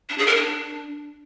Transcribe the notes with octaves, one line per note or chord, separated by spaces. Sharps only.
D4
G#4
A#4
D4